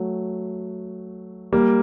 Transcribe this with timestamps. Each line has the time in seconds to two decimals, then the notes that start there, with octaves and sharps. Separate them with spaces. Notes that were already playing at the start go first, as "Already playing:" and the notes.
Already playing: F#3 A3
1.53 G3 A#3